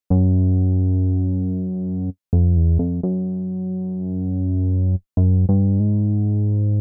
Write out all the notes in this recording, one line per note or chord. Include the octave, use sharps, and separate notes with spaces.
F#2
F2
E2
F2
F#2
F#2
G2
G#2